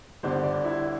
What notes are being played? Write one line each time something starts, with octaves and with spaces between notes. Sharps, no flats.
G1 G2 D3 C5
D5
E4